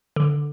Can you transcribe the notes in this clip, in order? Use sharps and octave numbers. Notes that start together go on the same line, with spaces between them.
D3